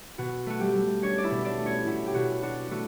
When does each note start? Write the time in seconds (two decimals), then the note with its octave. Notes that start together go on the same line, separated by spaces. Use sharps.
0.18 B2 F#4
0.46 A3 F#4
0.60 G3 G4
0.75 A3
1.02 C#4 D4 C#5
1.18 D5
1.23 E4 E5
1.31 B2
1.45 D4 D5
1.58 A3
1.65 C#4 C#5
1.87 B2 E4
2.06 G4
2.14 B2 F#4
2.42 D4 F#4
2.71 A3 F#4